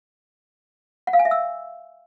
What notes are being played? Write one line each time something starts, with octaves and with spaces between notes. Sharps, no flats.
F#5
F5
G#5
E5
E6